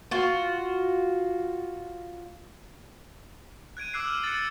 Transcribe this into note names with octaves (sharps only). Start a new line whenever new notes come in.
F4 F#4
F#6 G#6 D7 D#7
D6 E6 F#6 C7
D6 F6 E7 F#7
A6 C#7
A6